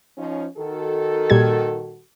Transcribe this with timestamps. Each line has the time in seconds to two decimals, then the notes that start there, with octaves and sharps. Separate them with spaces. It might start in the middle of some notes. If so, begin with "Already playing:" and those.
0.17 F3 C#4 D#4
0.57 D#3 F#4 A4
1.30 A#2 G3 G#6